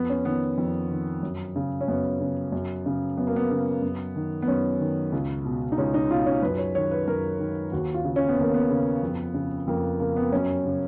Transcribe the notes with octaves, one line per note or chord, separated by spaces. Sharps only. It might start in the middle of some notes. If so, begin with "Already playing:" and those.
Already playing: F2 B3
C#4
D#3 B3
F2
D#3
F#2
C#3
C#4
F#2 B3
C#3
F#2
C#3
F#2 B3
A#3
B3
C#3
F#2
D#3
B3
F#2 C#4
D#3
C#2
B2
D#4
C#2 C#4
D#4
B2 F4
C#4
F#2 B4
C#5
D#3 C#5
B4
F#2 A#4
D#3
D#2 F#4
F4
C#3
C#4
B3
D#2 A#3
B3
C#3
F2
C#3
F2 A#3
C#3 A#3
B3
F#2 C#4
C#3